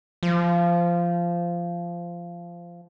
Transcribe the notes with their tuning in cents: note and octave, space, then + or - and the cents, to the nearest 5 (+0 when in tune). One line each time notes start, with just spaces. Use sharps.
F3 -15